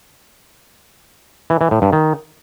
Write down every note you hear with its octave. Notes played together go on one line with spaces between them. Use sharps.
E3
E3
A2
G2
D#3